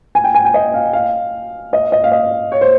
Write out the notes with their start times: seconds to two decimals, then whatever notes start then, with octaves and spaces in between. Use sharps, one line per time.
0.15 G#5
0.24 G5
0.35 G#5
0.45 G5
0.54 D#5
0.74 F5
0.93 F5
1.73 D#5
1.92 D#5
2.04 F5
2.12 D#5
2.52 C#5
2.61 C5